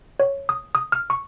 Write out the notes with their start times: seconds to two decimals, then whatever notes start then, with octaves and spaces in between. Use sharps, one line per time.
0.20 C#5
0.49 D#6
0.75 D#6
0.92 F6
1.10 C#6